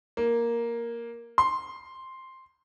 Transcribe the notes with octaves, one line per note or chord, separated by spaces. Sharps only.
A#3
C6